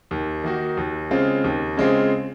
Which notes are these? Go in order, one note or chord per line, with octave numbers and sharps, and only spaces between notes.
D#2
D#3 A#3 D#4 F#4
D#2
C#3 G#3 C4 F4
D#2
C#3 G#3 C4 F4